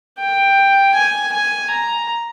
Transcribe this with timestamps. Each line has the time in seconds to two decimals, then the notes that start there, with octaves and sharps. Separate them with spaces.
0.19 G5
0.94 G#5
1.32 G#5
1.70 A#5